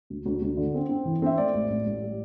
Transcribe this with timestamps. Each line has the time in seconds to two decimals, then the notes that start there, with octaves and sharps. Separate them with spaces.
0.10 D2
0.26 D2
0.42 D2
0.57 D3
0.74 C4
0.89 C4
1.05 E3
1.22 C4 E5
1.38 A3 D5
1.54 A1
1.70 A1
1.86 A1
2.02 G3